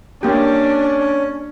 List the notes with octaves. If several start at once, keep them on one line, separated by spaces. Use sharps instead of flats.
A#3 C#4 D4 G4